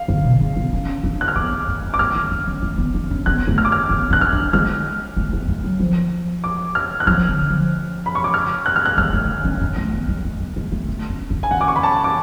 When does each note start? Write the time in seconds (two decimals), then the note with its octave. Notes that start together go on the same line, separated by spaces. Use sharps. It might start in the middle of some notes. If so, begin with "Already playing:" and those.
Already playing: F5
0.08 D3
0.24 B2
0.41 C#3
0.57 B3
0.73 C#4
1.03 D4
1.21 F#6
1.28 F6
1.36 B3 D6
1.51 G#3
1.68 A3
1.84 C#4
1.94 D6
1.99 A3 F6
2.16 A3
2.31 D4
2.47 C#4
2.62 A3
2.78 B3
2.94 D4
3.11 C#4
3.26 B3 F#6
3.47 A3
3.58 F6
3.65 D6
3.72 F6
3.90 B3
4.10 D4 F#6
4.21 F6
4.32 D4
4.53 G#3 F6
5.17 A3
5.33 B3
5.48 A3
5.64 F#3
5.80 F3
6.44 D6
6.75 F6
7.00 F#6
7.07 F3 F6
7.29 D3
7.50 F3
8.06 B5
8.15 C#6
8.24 D6
8.34 F6
8.66 F#6
8.76 F6
8.86 F#6
8.97 G#3 F6
9.13 A3
9.45 C#4
9.61 C#4
9.76 A3
9.93 B3
10.08 G#3
10.25 A3
10.40 G#3
10.56 G#3
10.72 A3
10.88 A3
11.10 C#4
11.30 D4
11.43 G#5
11.51 C#4 F#5
11.61 D6
11.68 C#6
11.76 B5
11.83 A5
12.04 D6